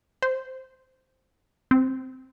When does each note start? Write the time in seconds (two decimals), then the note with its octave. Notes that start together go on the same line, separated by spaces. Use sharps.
0.22 C5
1.71 C4